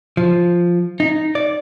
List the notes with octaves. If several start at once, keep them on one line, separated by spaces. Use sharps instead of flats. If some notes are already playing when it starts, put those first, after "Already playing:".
F3
D#4
D5